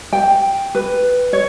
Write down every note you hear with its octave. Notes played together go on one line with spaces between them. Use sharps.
G5
B4
C#5